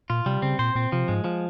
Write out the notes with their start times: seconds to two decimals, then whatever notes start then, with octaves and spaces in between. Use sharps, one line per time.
0.10 A#2 F4
0.26 C3 G3
0.42 C#3 C4
0.59 A#2 C5
0.75 A#2 C4
0.92 C3 F3
1.08 G#2 G#3
1.24 F3